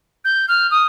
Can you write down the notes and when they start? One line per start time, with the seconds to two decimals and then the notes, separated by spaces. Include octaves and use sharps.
0.25 G6
0.48 F6
0.71 D#6